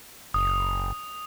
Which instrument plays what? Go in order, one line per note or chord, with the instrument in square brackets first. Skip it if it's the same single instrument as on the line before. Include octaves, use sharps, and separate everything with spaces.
[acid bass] F#1 [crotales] D#6